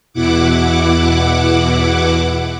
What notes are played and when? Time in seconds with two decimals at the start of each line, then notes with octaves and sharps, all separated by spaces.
0.13 E2 B2 E4 F#5 D6